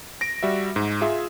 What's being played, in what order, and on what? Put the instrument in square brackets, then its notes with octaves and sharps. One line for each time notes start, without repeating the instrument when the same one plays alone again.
[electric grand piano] A#6 D7
G3 F#4 E5
G#2
F4 G#4 E5